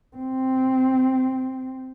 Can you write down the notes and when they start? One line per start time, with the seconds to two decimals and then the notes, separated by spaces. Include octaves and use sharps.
0.16 C4